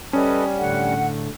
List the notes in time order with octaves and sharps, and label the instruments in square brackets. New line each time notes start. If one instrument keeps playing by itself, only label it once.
[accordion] G3 [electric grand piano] C#4 [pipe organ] A4 B4 D#5
[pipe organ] A2 D3 A3 [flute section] F#5